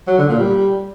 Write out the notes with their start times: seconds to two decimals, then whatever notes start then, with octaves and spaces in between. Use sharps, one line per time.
0.07 F#3
0.18 D3
0.29 A#2
0.39 G3